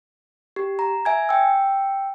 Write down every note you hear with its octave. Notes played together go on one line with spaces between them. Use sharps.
G4
A#5
E5 G#5 G#6
G5 E6